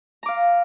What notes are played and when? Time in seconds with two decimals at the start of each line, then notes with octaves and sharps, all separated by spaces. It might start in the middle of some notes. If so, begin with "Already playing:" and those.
0.23 A#5
0.26 D6
0.28 F5